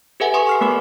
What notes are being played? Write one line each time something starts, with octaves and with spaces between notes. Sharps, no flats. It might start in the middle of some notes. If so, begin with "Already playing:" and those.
G4 A4 B4 E5 F#5 G#5
B4 G#5 C6 C#6 D#6
C#6 F6 C7
A3 B3 A#4 D6